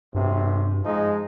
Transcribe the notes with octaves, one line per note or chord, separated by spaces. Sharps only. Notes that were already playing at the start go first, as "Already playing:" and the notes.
B1 G2 C3
F3 G#3 D#4